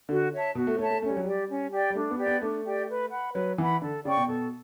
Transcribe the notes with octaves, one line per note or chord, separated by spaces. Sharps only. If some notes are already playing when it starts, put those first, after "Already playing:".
D3 F#4
C#5 E5 A5
B2 F#4
A3
A3 C#5 E5 A5
A3
A3 C#4
G3
F#3
G3 G4 D5 G5
C#4
G4 D5 G5
G3
A3 D4
B3
G4 D5 G5
B3
A3 D4
G4 D5 G5
B4
F#5 B5
F#3 B4
E3 F#5 B5
D3 A4
C#3 D5 G5 C#6
B2
B2 A4